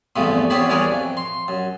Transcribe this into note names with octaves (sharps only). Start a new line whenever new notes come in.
E2 G2 C3 F3 G#3 A3
E2 C4 C#4 G4 G#4 B5
E3 G3 D4 G#4 A#4 C#5
F2
C6
F#2